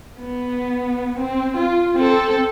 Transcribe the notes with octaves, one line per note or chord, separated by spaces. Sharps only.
B3
C4
F4
C4 A4